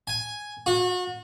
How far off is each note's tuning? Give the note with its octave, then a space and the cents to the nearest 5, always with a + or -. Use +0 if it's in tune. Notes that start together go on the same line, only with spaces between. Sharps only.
G#5 +0
F#4 -35